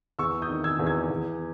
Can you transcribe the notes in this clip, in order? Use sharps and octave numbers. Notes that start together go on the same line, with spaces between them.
E2 C#6 E6
D#6 G6
D#3
E6 G#6
E2
E6 G#6
E2